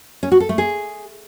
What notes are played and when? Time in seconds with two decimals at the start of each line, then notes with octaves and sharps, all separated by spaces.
0.23 C#4
0.32 F#4
0.40 A4
0.49 A3
0.58 G#4